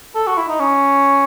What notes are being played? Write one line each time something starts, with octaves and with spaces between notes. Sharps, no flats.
A4
F#4
E4
D#4
C#4